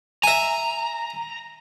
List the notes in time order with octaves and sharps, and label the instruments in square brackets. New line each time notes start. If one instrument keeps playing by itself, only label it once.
[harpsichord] E5 G#5 [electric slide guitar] A#5